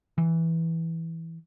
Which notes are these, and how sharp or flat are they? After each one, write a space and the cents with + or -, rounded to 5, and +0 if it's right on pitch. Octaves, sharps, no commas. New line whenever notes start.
E3 -5